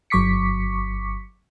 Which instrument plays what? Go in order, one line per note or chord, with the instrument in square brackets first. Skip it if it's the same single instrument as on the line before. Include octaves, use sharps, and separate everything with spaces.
[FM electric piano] G1 F#3 C#6 D6 B6 C#7